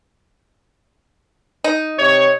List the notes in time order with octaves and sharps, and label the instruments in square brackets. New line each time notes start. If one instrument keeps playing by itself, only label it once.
[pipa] D#4
[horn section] C3 C#5